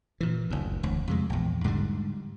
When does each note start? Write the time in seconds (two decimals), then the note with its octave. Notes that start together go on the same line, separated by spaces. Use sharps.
0.21 A#2 E3
0.50 F#1 D2
0.83 E1 D2
1.08 F2 C3 G#3
1.30 A#1 E2
1.64 G#2 D3 F#3 G3